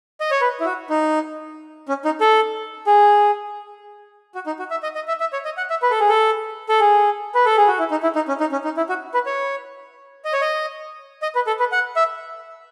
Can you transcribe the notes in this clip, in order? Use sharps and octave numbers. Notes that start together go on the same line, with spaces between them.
D#5
C#5
B4
E4
F#4
D#4
C#4
D#4
A4
G#4
F#4
D#4
F#4
E5
D#5
D#5
E5
E5
C#5
D#5
F#5
E5
B4
A4
G#4
A4
A4
G#4
B4
A4
G#4
F#4
E4
D#4
E4
D#4
C#4
D#4
C#4
D#4
E4
F#4
B4
C#5
D#5
C#5
D#5
D#5
B4
A4
B4
F#5
E5